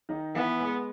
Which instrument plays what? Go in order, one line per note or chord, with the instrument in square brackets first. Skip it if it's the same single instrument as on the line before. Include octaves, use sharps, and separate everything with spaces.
[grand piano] D#3 D#4
[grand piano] E3 E4 [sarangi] B3
[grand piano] G#3 G#4